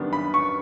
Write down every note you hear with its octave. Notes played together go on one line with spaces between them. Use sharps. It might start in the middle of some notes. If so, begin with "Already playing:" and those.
Already playing: F#2 D#3 G3 B3 D4
B5
C#6